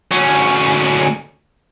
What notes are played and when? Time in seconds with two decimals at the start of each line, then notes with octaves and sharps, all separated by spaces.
0.12 D2 C#4